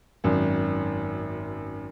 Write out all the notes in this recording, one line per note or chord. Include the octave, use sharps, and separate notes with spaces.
G#1 F#2